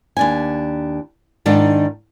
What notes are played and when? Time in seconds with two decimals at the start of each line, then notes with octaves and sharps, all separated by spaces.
0.17 D#2 D4 G#5
1.46 G#2 D#3 D4 D#4